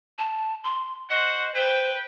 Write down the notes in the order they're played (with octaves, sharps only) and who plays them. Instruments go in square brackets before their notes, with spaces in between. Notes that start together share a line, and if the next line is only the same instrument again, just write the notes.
[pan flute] A5
C6
[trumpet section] F#4 C5 F#5 [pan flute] D#5
[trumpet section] B4 G5 [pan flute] C5